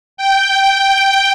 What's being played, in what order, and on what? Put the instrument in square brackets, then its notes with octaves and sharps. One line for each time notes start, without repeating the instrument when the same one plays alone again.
[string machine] G5